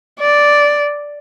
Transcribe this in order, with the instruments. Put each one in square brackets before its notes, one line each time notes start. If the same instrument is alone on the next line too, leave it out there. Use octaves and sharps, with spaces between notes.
[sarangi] D5